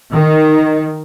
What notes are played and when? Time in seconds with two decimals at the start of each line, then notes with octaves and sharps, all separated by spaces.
0.13 D#3